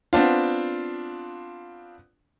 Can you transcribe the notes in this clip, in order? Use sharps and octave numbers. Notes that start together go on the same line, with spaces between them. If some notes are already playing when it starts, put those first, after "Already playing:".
B3 C4 D4 F4